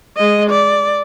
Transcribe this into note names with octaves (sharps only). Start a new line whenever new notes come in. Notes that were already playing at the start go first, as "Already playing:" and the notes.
G#3 D#5
D5